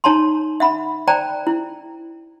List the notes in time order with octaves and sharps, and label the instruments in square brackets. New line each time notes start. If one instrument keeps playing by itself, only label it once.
[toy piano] D#4 C#5 A5 A#5 C6
E5 F#5 B5
C5 D5 G5 A5 A#5
E4